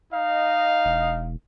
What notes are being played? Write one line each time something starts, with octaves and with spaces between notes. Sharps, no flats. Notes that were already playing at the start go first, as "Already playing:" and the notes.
D#4 D#5 F5
E1